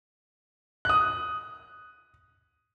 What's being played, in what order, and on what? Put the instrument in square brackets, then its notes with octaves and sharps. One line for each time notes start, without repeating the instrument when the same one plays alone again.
[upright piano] D#6 F#6